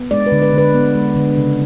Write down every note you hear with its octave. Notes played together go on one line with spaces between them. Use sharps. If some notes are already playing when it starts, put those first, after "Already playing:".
Already playing: B3
G#3 D5
B4
D3
B4
D3 B4
B3
G#3
D3
C#3